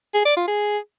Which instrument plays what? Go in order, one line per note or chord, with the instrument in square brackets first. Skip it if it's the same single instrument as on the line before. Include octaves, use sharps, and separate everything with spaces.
[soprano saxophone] G#4
D5
F4
G#4